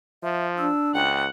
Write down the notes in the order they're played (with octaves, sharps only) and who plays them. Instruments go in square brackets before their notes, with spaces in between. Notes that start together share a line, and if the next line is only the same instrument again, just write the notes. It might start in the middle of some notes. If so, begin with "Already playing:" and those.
[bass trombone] F3 [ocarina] E5
[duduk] D4 [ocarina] E6
[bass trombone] C#2 [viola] F#5 [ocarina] G5